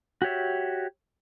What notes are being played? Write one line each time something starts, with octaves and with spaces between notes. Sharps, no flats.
F#4 G4 C#5 E5